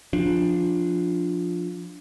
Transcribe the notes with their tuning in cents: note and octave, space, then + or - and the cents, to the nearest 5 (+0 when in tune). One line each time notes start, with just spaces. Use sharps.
F3 +10 D4 +0